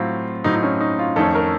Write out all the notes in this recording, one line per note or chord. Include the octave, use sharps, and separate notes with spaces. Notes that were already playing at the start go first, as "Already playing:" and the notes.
Already playing: A2 F#3 C4 F4
A2 F#3 C4 D#4
D#4
C#4
D#4
F4
F2 D#3 A3 C#4 A4
A#4